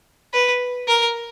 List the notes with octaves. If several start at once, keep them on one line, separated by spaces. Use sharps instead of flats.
B4
A#4